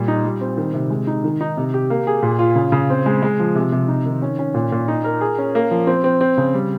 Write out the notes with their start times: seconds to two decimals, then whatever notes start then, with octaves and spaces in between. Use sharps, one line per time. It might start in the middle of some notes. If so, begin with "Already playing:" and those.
Already playing: A#2 G3
0.08 D#4
0.24 G3
0.41 C4
0.58 D#3
0.74 C3
0.90 G#3
1.07 D#4
1.24 D#3
1.41 D#4
1.57 C3
1.74 G4
1.90 A#3
2.07 G#4
2.23 A#2
2.39 F4
2.56 C#3
2.72 C#3
2.90 C4
3.06 G#3
3.23 G#3
3.40 F3
3.55 C3
3.72 C3
3.88 D#4
4.06 D#3
4.22 C#4
4.39 C#4
4.54 A#2
4.72 A#2
4.88 D#4
5.04 A#4
5.21 G#4
5.39 C#4
5.55 A#3
5.71 F3
5.87 C4
6.04 C4
6.21 C4
6.38 C#3
6.54 G3